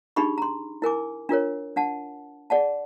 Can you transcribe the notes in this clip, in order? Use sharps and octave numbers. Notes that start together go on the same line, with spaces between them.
D4 D#4 G4 G#4 B5 C#6
A#5 C6
E4 A#4 G#5 D6
D4 F4 A#4 C#5
D4 F#5 A5
G#4 D5 F#5 A5